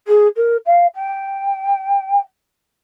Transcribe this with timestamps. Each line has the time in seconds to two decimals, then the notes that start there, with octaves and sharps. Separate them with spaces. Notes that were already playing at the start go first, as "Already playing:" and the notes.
0.07 G#4
0.36 A#4
0.66 F5
0.94 G5